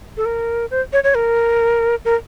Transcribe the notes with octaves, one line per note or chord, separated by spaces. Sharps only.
A4
A#4
C5
C#5
C#5
A#4
A#4